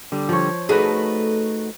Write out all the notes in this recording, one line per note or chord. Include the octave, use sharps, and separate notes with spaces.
D3 G3
F3 C#5
A3 D#4 F#4 G#4 B4